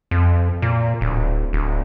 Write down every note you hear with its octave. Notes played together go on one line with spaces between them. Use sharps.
F2
A#2
D1
D1